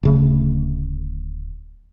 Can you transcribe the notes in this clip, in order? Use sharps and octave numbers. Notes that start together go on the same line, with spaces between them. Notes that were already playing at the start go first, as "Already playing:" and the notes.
D1 C#3 A3